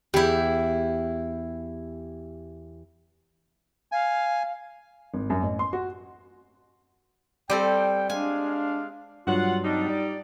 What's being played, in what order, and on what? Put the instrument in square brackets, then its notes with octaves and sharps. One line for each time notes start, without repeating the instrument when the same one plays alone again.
[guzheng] E2 E4 [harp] G4
[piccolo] F5 [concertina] G#5
[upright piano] G#1
F#2
A1
C6
F#4
[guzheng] G3 C4 A4 [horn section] G5
[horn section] G#3 F5 [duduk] D4 [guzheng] G#5
[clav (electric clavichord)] G2 F#3 [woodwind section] F4 [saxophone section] F#5
[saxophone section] G3 D#4 [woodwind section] C4 D4
[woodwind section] D5